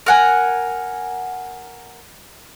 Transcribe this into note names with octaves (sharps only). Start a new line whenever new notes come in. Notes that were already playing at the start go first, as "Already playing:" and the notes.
A#4 F#5 G#5